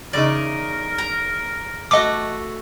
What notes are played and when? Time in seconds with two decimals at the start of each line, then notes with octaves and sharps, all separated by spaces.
0.13 E2 C#3 D#4 A#4 D5
0.98 A#5
1.91 A3 F#4 D#5 D6